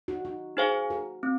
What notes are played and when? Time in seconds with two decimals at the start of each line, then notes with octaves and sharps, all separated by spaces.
0.08 D#4 F#4
0.25 D#4 F#4
0.57 D#4 G#4 C5 F5 G#5
0.90 F#4 A#4
1.23 C4